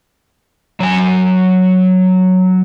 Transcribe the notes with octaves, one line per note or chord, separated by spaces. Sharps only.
F#3 G#5